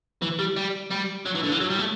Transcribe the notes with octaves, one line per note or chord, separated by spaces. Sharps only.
E3
G3
G3
G3
F#3
E3
D3
E3
F#3
G3
A3